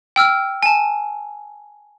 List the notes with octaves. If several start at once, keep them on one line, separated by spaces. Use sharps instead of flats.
G5 E6 F6
G#5 A5